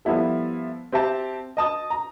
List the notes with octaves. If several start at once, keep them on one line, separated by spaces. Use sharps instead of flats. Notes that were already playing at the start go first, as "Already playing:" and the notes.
F3 G3 B3 E4 A4
C4 G4 E5 A5
D#5 A5 D#6
A#5